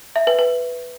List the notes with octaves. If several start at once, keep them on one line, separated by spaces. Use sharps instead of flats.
E5
B4
B4